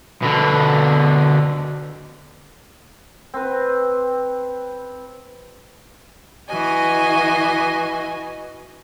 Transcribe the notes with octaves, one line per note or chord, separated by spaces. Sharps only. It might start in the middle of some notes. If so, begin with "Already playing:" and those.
B2 D3
C4 B4
E3 F#4 D#5 G#5